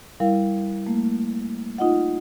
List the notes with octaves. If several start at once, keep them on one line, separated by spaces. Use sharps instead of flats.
G3 E4 A#4 F5
A3 A#3
D#4 F4 D#5 F#5